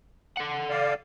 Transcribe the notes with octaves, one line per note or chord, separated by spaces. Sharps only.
A4 F#5
D5 F5